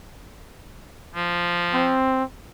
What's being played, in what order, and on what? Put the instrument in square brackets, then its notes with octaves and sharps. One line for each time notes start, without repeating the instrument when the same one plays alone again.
[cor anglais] F3
[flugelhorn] C4